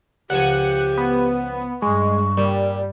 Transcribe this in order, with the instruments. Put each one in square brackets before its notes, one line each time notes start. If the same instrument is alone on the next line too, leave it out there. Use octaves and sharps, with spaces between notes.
[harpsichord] C#2 F3 G#5 [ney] G4 [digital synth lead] F#5
[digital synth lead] B3
[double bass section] G2 [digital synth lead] G#3 [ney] C#6
[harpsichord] A#2 [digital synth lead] G3